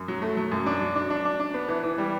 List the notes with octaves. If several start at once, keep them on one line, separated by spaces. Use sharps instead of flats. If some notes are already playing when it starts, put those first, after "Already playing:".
Already playing: F#2
F#3
A3
F#3
F#2
D4
F#3
D4
D4
D4
D4
B3
E3
E3
G3